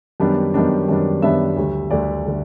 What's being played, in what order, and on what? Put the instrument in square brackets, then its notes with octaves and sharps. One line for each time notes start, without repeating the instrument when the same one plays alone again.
[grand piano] F#2 D#3 G3 B3 D4
F#2 D#3 G3 B3 D4
F#2 D#3 G3 B3 D4
F#2 D#3 G3 B3 D4 E5
D2 D3 G3
D2 D3 G3 D5
D3 G3